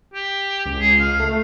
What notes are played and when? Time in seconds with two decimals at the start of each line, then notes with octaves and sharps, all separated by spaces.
0.14 G4
0.66 C#2
0.80 G#4
1.00 F5
1.20 A3